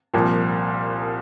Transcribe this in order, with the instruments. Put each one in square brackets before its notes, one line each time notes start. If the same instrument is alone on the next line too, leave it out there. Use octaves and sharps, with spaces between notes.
[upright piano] C2 A#2 F3